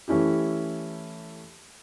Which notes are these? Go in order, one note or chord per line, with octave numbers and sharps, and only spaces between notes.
E3 A3 C#4 E4 G4